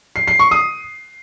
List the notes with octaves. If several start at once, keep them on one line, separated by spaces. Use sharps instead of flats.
C7
C7
C#6
D#6